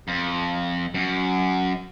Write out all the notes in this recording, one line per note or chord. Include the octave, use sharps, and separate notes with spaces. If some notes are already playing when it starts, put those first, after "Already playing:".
F2
F#2